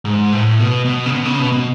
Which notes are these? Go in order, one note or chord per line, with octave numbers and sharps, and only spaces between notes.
G#2
A2
B2
B2
C#3
B2
C#3
B2
B2